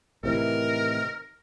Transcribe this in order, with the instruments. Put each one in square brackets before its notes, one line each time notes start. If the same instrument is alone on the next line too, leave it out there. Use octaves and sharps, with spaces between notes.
[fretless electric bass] A2 C3 E3 [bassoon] D#3 [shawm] A#4